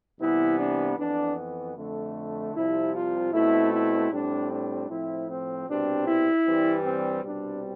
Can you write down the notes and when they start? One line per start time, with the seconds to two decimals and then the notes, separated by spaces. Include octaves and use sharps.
0.20 C2 C3 E3 B3 E4
0.59 D4
0.98 F2 E3 B3 D4
1.77 F2 D3 A3
2.54 C2 C3 F3 E4
2.94 F4
3.33 B2 A3 C4 E4
3.73 E4
4.11 A2 G3 C4 D4
4.51 D4
4.89 A2 F3 C4 E4
5.28 C4
5.68 C2 B2 G3 C4 D4
6.07 E4
6.46 G2 E3 G3 C4
6.85 C4
7.24 C2 B2 G3 C4 D4